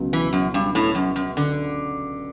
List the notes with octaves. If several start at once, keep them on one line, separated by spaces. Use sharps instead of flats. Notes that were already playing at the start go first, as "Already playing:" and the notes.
Already playing: C#2 B2 F#3
E3
F#2
G2
A2
F#2
F#2
D3